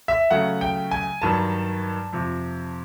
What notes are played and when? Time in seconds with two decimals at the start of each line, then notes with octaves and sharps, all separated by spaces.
0.08 E5
0.31 C#3 F#3 A3 F#5
0.61 G5
0.91 G#5
1.22 G2 D#3 F#3 A5
2.13 F2 C3 F3